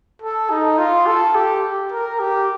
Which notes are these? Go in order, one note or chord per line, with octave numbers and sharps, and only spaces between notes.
A4
D#4
F4
A4
G4
A#4
G4